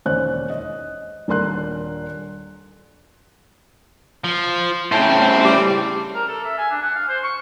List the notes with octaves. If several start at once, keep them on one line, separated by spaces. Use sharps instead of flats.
E1 D#2 C#4 C5 D5 F#6
D#5
D#1 D4 A#4 C6 F#6
F3
A2 C#3 C5 G5 A5
G3 D6
A#4
A4
E5
G#5
D4
F#5
F5
C5
C#6